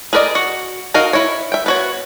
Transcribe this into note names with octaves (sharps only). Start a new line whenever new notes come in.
G#4 A#4 B4 D5 D#5
F#4
D#4 F#4 A#4 D#5 F5
E4 C#5
E5 G5
B3 F#4 C#5